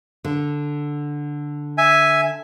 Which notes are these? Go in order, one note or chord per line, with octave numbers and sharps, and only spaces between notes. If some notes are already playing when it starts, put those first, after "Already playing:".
D3
E5 G#5